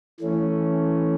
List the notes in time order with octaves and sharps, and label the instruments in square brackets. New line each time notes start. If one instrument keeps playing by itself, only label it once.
[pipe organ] E3 A3 C#4